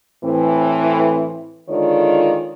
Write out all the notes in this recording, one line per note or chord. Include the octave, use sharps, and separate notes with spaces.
A2 E3 C4
D3 D#3 G#3 F4 C#5 D5